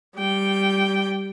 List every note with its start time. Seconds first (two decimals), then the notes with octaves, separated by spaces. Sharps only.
0.15 G3 G5